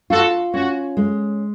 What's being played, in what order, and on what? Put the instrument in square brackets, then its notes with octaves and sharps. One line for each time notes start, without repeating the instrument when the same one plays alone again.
[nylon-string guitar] F4 [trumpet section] F#4 A4
[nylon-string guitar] C#4 [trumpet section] F#4
[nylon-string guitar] G#3